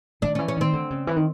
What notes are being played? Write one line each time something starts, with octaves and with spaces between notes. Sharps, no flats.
D#3 D4
E3 C#4
C#4
D#3 C4
D3
C#3
E3
D#3